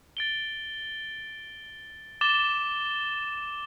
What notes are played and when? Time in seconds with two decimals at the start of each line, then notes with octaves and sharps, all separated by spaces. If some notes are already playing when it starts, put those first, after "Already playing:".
0.17 A6 D7 G7
2.21 D6 A6 E7 G7